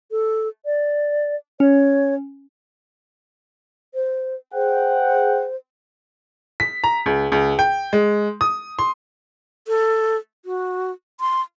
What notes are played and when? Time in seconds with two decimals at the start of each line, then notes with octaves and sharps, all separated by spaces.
0.11 A4
0.65 D5
1.60 C#4 C#5
3.95 C5
4.54 G#4 C5 F#5 G5
6.60 B6
6.84 A#5
7.06 C#2
7.32 C#2
7.59 G5
7.93 G#3
8.41 D#6
8.79 C6
9.68 A4
10.45 F#4
11.20 C6